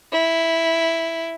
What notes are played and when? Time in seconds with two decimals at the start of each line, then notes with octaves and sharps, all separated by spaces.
0.12 E4